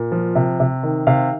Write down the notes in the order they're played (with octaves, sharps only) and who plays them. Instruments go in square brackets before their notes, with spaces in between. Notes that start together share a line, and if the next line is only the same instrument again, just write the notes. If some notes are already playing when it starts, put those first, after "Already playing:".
Already playing: [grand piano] A#2
F3
C3
C3
D#3
C3 F5